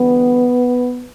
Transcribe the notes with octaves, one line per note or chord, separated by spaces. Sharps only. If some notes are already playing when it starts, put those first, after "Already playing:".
Already playing: E2 D3 G3 B3